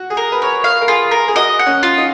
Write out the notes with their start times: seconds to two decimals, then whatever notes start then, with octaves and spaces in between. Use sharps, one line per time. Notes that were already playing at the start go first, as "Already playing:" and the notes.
Already playing: F#4
0.10 G#4
0.17 A#4
0.32 B4
0.42 A#4 C#5
0.64 F5
0.82 A#4
0.88 F4 G#4
1.11 A#4
1.28 G#4
1.35 F#4 D#5
1.59 F#5
1.66 C#4
1.83 F4
1.98 D#4